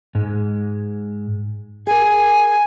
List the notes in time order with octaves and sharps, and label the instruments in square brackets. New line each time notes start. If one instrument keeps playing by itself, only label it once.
[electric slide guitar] G#2 G#3
[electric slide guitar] G#4 A#4 [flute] G#5